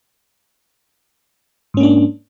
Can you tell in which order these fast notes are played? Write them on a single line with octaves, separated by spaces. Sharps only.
G#2 C#4 A#3 D4